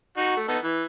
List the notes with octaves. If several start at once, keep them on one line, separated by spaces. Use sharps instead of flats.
D#4 F#4
A3
B3 D#4 A4
E3